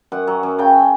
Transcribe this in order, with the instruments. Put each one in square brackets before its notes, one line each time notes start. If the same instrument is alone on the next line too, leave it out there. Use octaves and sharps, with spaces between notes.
[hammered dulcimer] F#2 F#5
F#3
F#2
C#3 G5